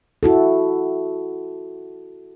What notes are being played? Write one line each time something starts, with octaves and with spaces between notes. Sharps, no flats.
E4 F#4 A4